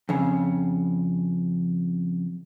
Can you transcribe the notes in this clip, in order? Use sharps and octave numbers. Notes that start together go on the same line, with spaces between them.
F2 C#3